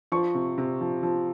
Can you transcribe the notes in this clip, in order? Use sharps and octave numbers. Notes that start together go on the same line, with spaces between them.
F3 C#6
C3
C3
F3
F3